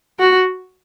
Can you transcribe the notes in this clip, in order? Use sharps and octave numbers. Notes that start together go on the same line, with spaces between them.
F#4